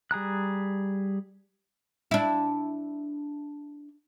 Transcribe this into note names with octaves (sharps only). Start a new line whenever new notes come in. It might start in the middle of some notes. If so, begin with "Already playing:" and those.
G3 G#4 A#5 F#6
D4 E4